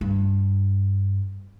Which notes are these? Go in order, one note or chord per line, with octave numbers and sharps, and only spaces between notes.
G2